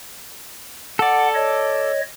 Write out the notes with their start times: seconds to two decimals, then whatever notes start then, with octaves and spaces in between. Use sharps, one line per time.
0.99 A4 D5 F#5
1.35 C#5 D#5